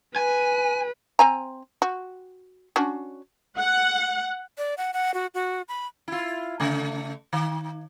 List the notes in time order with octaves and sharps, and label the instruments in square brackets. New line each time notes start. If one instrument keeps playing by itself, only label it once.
[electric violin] B4 [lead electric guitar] G#5
[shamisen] C4 G#5 A#5
F#4
C#4 D4 F#4
[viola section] F#5
[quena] D5
F#5
F#5
F#4
F#4
B5
[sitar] E4 F4
C#3 A3
D#3